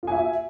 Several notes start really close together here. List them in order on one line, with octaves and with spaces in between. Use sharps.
F4 G#5 E5 F#4